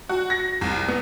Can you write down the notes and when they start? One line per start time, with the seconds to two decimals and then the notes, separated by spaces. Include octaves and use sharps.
0.09 F#4
0.30 A#6
0.61 C2
0.88 B3